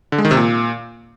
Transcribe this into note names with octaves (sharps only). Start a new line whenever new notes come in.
D3
G#3
D#3
C3
A#2